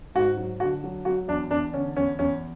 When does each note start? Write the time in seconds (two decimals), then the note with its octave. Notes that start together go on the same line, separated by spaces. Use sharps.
0.15 G#2 F#4
0.37 F#3
0.60 D3 F#4
0.84 F#3
1.05 F#3 F#4
1.28 E2 D4
1.50 E2 D4
1.73 D3 C#4
1.97 E2 C#4
2.19 E2 C#4